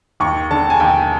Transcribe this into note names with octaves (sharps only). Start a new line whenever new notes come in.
D#2 C#6
D3 A5
G#5
D#2 G5